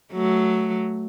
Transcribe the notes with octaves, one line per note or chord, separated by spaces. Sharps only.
F#3 A3